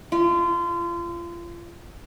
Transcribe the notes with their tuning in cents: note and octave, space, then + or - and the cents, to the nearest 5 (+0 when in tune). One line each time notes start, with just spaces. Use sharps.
F4 -30